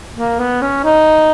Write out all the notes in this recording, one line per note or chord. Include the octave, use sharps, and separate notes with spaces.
A#3
B3
C#4
D#4